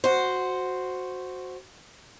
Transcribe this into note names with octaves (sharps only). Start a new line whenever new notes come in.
F#4 C5